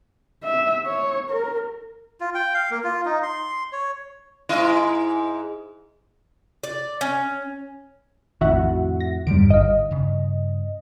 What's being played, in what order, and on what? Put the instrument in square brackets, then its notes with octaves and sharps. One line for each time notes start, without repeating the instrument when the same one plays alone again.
[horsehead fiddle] E5
C#5
A#4
[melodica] F4
G5
F5
A#3
F4
D#4
C6
C#5
[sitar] G#2 E4 D#5
[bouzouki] D5
C#4
[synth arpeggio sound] A#1 D#3 [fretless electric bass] F2 A2 [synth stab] F#4 E5 F#5
[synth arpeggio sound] A#6
[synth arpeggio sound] E2 G2 [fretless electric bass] D3 D#3 G3 [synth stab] D7
[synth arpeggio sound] G#1 F5 [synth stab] D#5
[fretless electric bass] G2 C#3